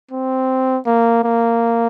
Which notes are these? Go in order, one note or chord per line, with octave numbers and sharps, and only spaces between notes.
C4
A#3
A#3